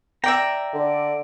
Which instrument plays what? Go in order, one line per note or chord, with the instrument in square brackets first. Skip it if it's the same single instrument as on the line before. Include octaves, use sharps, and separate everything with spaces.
[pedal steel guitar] D5 A#5 [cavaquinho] E5 G5
[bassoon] D3